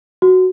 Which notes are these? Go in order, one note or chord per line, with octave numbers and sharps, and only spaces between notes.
F#4